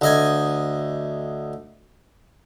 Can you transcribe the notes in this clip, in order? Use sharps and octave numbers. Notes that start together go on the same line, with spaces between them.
D2 D#5 G#5